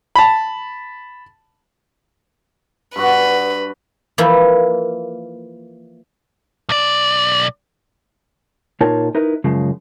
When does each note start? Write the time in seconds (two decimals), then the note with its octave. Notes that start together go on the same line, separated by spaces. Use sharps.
0.16 A5 B5
2.96 G2 F#4 B4
4.18 E3 F3 A#3 E4
6.69 B1 D5
8.81 A#2 D#4 F4 A#4 C#5 A5
9.15 D#4 E4 A#4 B4
9.44 F#2 C#3 F3 G#3